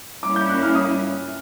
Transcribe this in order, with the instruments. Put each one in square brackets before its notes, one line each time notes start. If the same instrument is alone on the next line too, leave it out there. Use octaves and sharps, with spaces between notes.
[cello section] G3 A#3 C#4 E4 [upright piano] D6
[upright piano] G6
F#6
F6
D#6